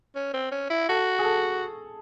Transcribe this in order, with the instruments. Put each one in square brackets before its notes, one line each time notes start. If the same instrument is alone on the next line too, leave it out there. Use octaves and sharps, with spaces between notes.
[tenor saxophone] C#4
C4
C#4
E4
[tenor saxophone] F#4 [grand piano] A4
[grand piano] G#4
A4